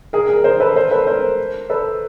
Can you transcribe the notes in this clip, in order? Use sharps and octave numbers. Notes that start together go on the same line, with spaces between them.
G#4 A#4
G#4 A#4
A#4 C5
A4 B4
A#4 C5
A4 B4
A#4 C5
A4 B4